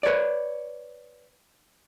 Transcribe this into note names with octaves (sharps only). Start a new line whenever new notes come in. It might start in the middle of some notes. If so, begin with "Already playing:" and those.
B4 C#5 D5